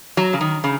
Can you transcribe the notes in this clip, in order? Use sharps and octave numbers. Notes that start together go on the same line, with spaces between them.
F#3
C#3
D#3
C#3